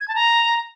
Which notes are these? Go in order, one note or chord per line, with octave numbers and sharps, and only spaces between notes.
G#6
A5
A#5